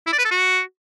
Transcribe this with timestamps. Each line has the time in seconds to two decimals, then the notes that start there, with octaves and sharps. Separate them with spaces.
0.07 E4
0.13 D5
0.19 B4
0.25 A4
0.31 F#4